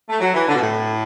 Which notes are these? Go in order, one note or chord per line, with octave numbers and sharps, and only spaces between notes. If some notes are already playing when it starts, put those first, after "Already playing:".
A3
F#3
E3
D3
B2
A2